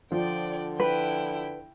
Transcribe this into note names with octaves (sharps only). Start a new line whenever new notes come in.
D3 F3 D5 G5
E4 B4 G5